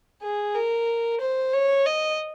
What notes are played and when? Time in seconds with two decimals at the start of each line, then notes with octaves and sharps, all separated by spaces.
0.23 G#4
0.55 A#4
1.21 C5
1.53 C#5
1.86 D#5